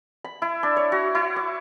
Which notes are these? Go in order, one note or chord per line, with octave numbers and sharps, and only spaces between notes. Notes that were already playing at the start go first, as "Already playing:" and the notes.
B5
E4
D4
C#5
F#4
E4
D6